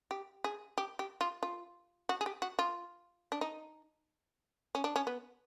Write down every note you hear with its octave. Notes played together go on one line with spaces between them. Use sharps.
G4
G#4
G4
G4
F4
F4
F#4
G#4
G4
F#4
F4
D4
D#4
C#4
D4
C#4
B3